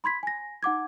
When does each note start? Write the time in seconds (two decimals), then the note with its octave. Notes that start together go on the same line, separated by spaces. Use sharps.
0.04 B5 C6 G#6 B6
0.23 G#5 A#6
0.63 D#4 F#5 D6 G#6